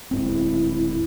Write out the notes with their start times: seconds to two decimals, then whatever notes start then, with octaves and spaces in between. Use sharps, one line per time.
0.11 D1 G#2 C4 E4